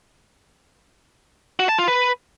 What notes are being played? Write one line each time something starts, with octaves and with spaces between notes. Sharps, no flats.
F#4
A5
F4
B4